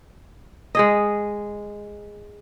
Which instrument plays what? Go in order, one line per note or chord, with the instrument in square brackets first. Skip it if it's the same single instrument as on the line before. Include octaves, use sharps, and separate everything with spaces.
[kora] G#3 G#4 D#5